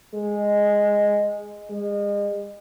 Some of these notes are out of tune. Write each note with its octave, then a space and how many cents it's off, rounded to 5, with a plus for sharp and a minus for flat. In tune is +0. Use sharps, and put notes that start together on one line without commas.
G#3 -10
G#3 -35